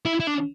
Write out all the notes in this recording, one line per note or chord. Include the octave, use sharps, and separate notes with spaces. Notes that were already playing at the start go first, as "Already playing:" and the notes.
E4
E4
D4